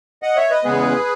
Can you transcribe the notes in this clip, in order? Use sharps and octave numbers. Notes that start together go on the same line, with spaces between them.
D#5 F#5
C#5 E5
B4 D#5
E2 C#3 G#3 B3 G#4 B4